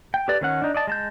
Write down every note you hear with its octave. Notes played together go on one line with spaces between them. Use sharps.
G5
G4 A4 B4 D5 D6
D#3 C#4 F#5
D4 D#4
D5 D#5 A5
G#3 A5 G6